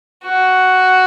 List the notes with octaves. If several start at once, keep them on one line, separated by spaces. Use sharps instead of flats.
F#4